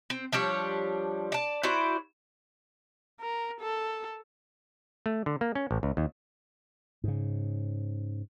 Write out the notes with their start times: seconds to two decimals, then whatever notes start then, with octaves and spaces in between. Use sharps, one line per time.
0.10 C4
0.32 F3 G3 D4 C#5
1.32 D5 A5
1.63 E4 F#4 C5 D5
3.20 A#4
3.60 A4
5.06 A3
5.26 D3
5.41 A#3
5.55 C#4
5.71 A1
5.83 C#2
5.97 D#2
7.04 G#2 C#3